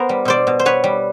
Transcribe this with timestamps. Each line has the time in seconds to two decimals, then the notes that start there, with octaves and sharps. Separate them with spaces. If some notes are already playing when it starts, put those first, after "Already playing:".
Already playing: B3 A#4 C5
0.09 G3
0.25 B2 C5 D5
0.47 B2
0.59 C5
0.65 B3 B4 C#5
0.84 G3